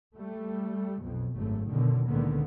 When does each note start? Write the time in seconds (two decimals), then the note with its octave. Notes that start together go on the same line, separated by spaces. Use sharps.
0.16 G3 A3
1.02 B1 F2 B2
1.37 G#1 F#2 A3
1.69 F#2 B2 D3 D#3
2.08 C#2 A#2 D3 D#3 A#3 B3